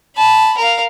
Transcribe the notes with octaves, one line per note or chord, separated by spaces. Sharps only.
A5 B5
A#4 F5